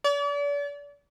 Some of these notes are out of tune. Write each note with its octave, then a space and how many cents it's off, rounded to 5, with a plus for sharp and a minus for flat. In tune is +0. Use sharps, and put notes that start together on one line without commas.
D5 -40